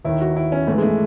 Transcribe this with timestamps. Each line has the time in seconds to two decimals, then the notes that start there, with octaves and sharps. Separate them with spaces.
0.05 D#2 D#3 E4
0.21 F#4
0.36 E4
0.52 C#4
0.67 G#2 E3 A3
0.78 G#3
0.83 A3